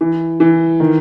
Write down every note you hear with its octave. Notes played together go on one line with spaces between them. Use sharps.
E3
E3
D#3